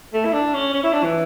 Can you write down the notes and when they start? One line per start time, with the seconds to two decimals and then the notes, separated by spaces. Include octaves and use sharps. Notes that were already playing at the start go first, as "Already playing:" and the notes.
0.14 A3
0.25 E4
0.33 D4
0.54 C#4
0.74 C#4
0.83 E4
0.93 D4
1.04 E3